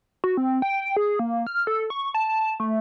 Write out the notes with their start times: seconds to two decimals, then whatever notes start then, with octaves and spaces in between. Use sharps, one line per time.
0.24 F#4
0.37 C4
0.62 G5
0.96 G#4
1.19 A#3
1.47 F6
1.67 A4
1.90 C#6
2.15 A5
2.60 A3